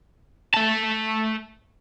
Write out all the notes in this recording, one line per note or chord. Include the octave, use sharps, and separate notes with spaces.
A3 A5